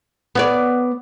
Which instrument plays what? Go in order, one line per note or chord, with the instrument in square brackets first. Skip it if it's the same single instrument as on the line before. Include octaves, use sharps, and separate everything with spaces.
[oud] B3 C#5 D5